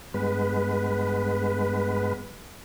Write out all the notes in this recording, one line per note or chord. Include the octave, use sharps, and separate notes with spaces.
G2 G#3 B3 B4